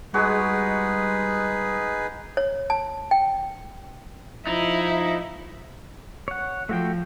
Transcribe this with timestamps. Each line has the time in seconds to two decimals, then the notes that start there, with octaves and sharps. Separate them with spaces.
0.14 G3 G#3 D#4 F#4 G#4 B4
2.37 C#5
2.70 A5
3.11 G5
4.47 F3 D#4 E4
6.28 C#5 F#5
6.69 F3 A3 F#4 G5